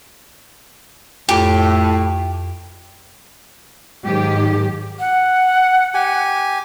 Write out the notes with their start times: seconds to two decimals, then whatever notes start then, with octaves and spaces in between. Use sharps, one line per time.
1.29 F2 A2 G4 D6
4.05 G#2 D#3 F#3 G4
4.99 F#5
5.94 G4 G#5